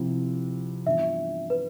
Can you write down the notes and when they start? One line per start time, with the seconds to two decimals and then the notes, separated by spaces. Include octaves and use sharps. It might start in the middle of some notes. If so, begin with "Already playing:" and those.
Already playing: C3 F3 C4 E4
0.86 G2 E3 B3 D4 F4 E5
1.50 B4